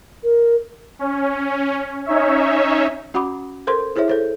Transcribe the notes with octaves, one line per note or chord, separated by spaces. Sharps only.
A#4
C#4
C#4 D#4 C#5 E5
C#4 F#4 F#5 B5 D6
A4 A#4 C5 C6
E4 G#4 C5 C#5 E5
A4 C5 C#5